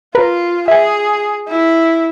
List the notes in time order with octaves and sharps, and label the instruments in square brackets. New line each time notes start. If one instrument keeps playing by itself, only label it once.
[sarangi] F4 [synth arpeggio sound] A#4 B4
[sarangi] G#4 [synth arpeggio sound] E5 G#5
[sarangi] E4